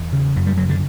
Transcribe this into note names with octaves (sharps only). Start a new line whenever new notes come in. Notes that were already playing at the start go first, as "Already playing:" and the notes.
Already playing: E2
C#3
F#2
G3
C#3 F#3
D3